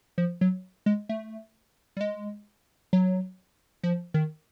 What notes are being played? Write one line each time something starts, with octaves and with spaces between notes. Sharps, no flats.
F3
F#3
G#3
A3
G3
G#3
F#3
F3
D#3